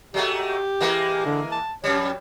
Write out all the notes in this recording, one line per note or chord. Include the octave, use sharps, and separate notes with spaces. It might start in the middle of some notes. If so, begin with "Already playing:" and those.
F#3 G#3 A3 G4
E3 G#3 A#3
D3
A5
F2 G3 C#5